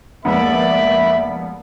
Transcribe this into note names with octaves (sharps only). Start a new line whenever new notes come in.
F1 C#2 D#3 A#3 B3 D5 E5 B5